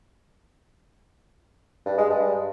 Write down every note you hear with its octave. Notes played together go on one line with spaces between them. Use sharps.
G2
G#3
G2